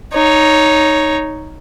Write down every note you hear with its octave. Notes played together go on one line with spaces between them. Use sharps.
D#4 C#5